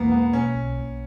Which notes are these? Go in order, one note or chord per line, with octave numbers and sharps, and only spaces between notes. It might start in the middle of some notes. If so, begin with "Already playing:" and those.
Already playing: A#1 E2 B2 E3 G#3 A#3 B3
G#3 B3
B2 C#4
B1
B1